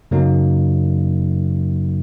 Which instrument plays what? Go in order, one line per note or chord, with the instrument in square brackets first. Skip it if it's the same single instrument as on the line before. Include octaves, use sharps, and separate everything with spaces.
[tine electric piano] F#2 C#3 F#3 A#3 D#4